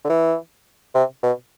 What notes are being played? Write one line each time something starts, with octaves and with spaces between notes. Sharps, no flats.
D3
E3
C3
B2